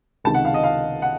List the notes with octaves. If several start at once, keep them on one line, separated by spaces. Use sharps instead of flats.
C#2 C3 D#3 A5
F#5
F5
D#5
F5
F#5